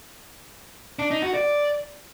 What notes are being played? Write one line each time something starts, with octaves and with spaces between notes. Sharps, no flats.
D4
D#4
F#4
D5